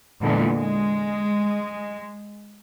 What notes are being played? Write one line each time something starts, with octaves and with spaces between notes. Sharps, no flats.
E2 A#2 D3 E3 G#3
G#3